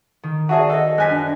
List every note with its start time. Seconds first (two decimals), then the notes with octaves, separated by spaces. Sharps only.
0.23 D#3
0.49 F#4 G#4 D5 E5 F#5 A5 D#7
0.70 A4 D#5
0.98 F#2 G#5 F#6 B6
1.10 D4